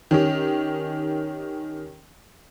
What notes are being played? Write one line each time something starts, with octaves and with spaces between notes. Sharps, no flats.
D#3 C#4 G4